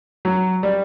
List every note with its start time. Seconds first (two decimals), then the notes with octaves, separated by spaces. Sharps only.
0.25 F#3
0.63 G3